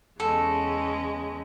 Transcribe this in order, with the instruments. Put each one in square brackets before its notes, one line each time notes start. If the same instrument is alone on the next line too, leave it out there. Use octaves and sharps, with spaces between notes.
[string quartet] E2 C#3 G#3 C#4 [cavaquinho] A4